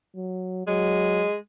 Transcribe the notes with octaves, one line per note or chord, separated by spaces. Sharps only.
F#3
F#3 G#3